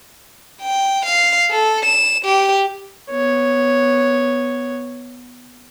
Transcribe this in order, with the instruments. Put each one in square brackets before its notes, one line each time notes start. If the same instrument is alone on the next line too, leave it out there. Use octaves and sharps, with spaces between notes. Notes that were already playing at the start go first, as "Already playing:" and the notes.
[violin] G5
F5
A4
E7
G4
[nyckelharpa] B3 C#5